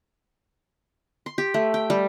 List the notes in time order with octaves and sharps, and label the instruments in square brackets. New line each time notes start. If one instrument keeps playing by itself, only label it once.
[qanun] C6
G4
A3
G5
G3